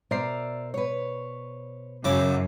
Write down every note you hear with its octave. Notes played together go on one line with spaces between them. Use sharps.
B2 A#4 C5 D5 E5 C7
B4 C#5
F#2 C#3 E4 D6